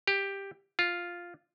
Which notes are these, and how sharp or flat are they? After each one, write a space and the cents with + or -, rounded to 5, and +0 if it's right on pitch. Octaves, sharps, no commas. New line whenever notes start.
G4 +10
F4 +0